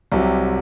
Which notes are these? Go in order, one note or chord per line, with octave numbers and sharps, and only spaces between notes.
C2 C3 F#3